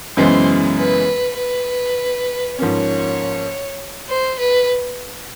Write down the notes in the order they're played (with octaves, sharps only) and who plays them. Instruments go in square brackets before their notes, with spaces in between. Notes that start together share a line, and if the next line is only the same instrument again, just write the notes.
[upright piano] F#2 C#3 E3 G#3 B3 [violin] C5
[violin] B4
B4
[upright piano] G#2 F3 A#3 C#4 [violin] C#5
[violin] C5
B4